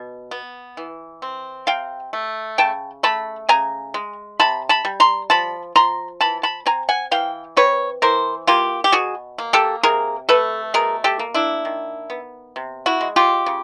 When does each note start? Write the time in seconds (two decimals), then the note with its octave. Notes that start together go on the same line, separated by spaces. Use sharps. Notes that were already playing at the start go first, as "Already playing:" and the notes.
Already playing: B2
0.31 B3
0.77 E3
1.22 C4
1.67 C3 F5 G5
2.13 A3
2.58 C#3 G5 A5
3.03 A3 A5 B5
3.49 C#3 G#5 A#5
3.94 G#3
4.40 C3 A5 B5
4.69 A5 B5
4.85 G3
5.00 A#5 C6
5.30 F3 A5 B5
5.76 F3 A#5 C6
6.21 E3 A5 B5
6.43 A5 B5
6.66 C4 G#5 A#5
6.89 F#5 G#5
7.11 E3 F5 G5
7.57 C4 B4 C#5
8.02 E3 A#4 C5
8.47 A#3 F4 G4
8.84 G4
8.92 B2 F#4 G#4
9.38 A#3
9.53 G4 A4
9.83 C3 G#4 A#4
10.29 A3 A4 B4
10.74 B2 G#4 A#4
11.04 G4 A4
11.19 A#3
11.34 D4 E4
11.65 D#3
12.10 B3
12.56 C3
12.86 E4 F#4
13.01 G#3
13.16 F4 G4
13.46 C#3